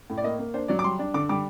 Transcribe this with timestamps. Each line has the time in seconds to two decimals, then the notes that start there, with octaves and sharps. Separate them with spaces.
0.10 A2
0.18 D5
0.23 A#3 D#5
0.39 A#3
0.54 D4 C5
0.68 F#3 D5
0.79 D6
0.84 G3 C6
0.99 D4
1.14 D3 D6
1.29 G3 D6